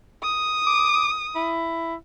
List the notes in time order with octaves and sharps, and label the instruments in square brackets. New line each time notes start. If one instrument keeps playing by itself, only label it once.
[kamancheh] D#6
[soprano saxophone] D6
E4